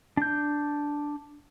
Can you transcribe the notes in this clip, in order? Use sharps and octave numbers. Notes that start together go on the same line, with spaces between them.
D4 G6